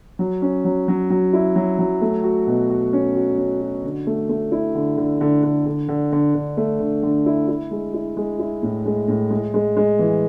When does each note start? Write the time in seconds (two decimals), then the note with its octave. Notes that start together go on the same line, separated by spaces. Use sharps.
0.19 F#3
0.42 C#4
0.65 F#3
0.88 F#3
1.10 F#3
1.33 E4
1.56 F#3
1.79 F#3
2.01 A3
2.24 F#4
2.47 B2
2.70 F#4
2.93 C#4
3.15 F#4
3.38 C#4
3.61 F#4
3.84 D3
4.07 A3
4.29 A3
4.52 E4
4.75 D3
4.98 D3
5.21 D3
5.43 D3
5.66 D3
5.88 D3
6.12 D3
6.35 D3
6.57 A3
6.80 D3
7.03 D3
7.26 E4
7.48 E4
7.71 G#3
7.94 E4
8.17 G#3
8.39 E4
8.63 A2
8.86 G#3
9.08 A2
9.31 G#3
9.54 G#3
9.77 G#3
9.99 E3